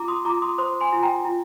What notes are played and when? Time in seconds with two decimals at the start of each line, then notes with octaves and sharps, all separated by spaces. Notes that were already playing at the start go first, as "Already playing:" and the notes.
Already playing: F4 A#5 D6
0.08 C6 D#6
0.25 F4 A#5 D6
0.42 C6 D#6
0.58 C5 C6 D#6
0.81 G#5 C6
0.92 F4
1.03 G5 A#5
1.25 F4